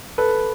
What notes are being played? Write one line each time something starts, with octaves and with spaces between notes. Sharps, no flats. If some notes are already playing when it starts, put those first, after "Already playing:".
A4 B4